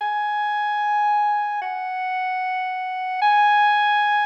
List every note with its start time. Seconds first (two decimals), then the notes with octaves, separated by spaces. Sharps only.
0.01 G#5
1.61 F#5
3.22 G#5